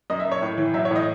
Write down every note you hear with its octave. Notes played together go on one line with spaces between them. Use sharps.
F#2 D#5
E5
F#2
C#5
A2
E3
F#3 E5
C#5
A2 D#5